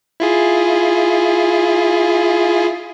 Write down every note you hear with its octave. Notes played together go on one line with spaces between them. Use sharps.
E4 F4 G#4